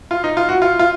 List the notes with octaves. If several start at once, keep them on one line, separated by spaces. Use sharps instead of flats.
F4
D#4
F4
F#4
F4
F4